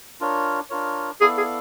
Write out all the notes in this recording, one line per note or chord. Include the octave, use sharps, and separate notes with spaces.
D4 F4 A#4 C#5
D4 F4 A#4 C#5
B3 E4 G#4 A4 D5 F5
G#4